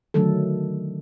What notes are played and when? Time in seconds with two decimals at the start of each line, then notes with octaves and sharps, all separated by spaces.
0.14 D3 D#3 F#3 A3 A4